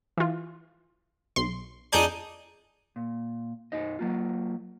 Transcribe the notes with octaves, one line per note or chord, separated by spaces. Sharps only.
E3 F4
B1 C6
F2 D4 D#4 G#4 G6
A#2
B1 F#2 D#4 D#5
F#3 A#3 F4